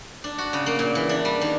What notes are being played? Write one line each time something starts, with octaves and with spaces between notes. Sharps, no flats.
D4
F#4
C#3
A#3
A#2
E3
D4
G3
D#3